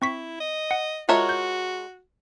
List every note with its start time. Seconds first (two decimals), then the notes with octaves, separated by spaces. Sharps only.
0.02 C4 E4 C#6 B6
0.40 D#5
0.71 F#5
1.09 G#3 F4 F#4 A#4 C#5 E5 A5
1.29 G6